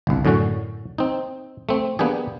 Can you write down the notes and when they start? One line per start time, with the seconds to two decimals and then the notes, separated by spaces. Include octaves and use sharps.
0.07 G1 C2
0.25 F#2 A2 D3 C#4 F#4
0.98 C4 D#4
1.69 A3 C4
1.99 A#3 B3 D4 G4 G#4